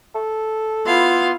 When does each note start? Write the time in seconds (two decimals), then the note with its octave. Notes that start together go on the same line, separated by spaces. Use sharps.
0.15 A4
0.86 B3 E4 F4 F5 C6